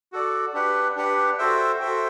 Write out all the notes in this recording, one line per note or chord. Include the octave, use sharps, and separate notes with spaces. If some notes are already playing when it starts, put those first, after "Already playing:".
F#4 A4 D5
D4 G4 B4 F#5
D4 G4 B4 F#5
F#4 A4 C5 E5 G5
F#4 A4 C5 E5 G5